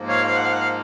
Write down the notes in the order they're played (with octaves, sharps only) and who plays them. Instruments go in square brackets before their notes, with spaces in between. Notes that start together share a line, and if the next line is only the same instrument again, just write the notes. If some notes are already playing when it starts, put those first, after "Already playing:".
Already playing: [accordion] G#2 F3 A#3
C#5 F5
F5
F#5
F5
F#5
F5